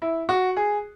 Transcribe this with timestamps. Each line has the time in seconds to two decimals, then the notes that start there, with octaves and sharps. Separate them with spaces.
0.02 E4
0.29 F#4
0.56 G#4